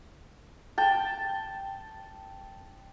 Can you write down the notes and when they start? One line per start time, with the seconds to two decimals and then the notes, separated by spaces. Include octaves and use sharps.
0.78 G5 A5